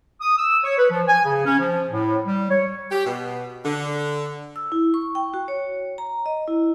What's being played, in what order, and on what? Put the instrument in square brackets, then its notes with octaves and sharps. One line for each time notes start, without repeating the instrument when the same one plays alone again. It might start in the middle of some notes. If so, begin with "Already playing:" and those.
[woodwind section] D#6
E6
C#5
B4
F3
G#5
C#3
C#4
F3
A2
G3
C#5
[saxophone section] G4
B2
D3
[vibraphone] E6
E4
C#6
G5
F#4
C#5
A#5
D#5
E4